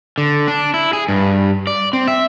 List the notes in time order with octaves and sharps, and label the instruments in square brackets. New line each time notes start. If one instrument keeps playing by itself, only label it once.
[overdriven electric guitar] D3
D4
E4
G#4
G2
D5
C4
E5